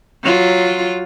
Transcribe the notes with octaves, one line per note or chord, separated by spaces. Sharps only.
F#3 F4